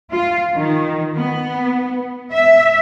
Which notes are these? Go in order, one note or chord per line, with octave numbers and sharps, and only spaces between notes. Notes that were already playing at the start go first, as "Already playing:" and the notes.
F4
D#3
B3
E5